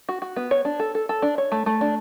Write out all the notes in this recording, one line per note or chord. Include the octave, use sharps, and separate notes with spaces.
F#4
F#4
B3
C#5
D4
A4
A4
A4
D4
C#5
A3
A3
D4